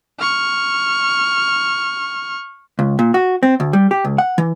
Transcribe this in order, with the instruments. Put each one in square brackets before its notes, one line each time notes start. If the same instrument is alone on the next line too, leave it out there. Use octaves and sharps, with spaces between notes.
[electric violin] C#6 F6
[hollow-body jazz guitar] C#2
A#2
F#4
C4
D2
G3
G4
C#2
F#5
E3